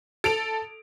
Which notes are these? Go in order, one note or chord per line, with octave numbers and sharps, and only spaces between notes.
A4 D7 F7